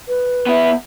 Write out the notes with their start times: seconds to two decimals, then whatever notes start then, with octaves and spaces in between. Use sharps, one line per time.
0.08 B4
0.47 B3 E4